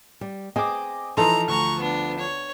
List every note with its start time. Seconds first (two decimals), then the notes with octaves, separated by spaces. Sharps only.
0.21 G3
0.56 C4 G#4 D#5 D6
1.17 E3 F3 D#4 A4 A#5 C6
1.48 D2 A#5 C#6
1.80 B3 D4
2.19 C#5